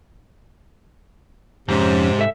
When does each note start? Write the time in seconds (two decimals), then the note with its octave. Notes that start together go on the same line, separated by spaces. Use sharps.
1.68 F2 G#2 C3 C#4
2.19 A4 E5